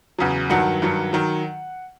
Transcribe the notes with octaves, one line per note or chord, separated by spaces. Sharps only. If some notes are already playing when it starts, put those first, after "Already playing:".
E2 C#3 F#3
G2 D#3 F#3 F#5
G2 D#3 F#3
D#3 F#3